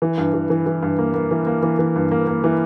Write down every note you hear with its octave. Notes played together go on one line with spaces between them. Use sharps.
E3
G2
E3
E3
E3
G2
A#3
A#3
E3
A#3
E3
E3
G2
A#3
A#3
E3